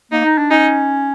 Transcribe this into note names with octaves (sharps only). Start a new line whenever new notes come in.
A#3 D#4
D#4
D4
C#4 D#4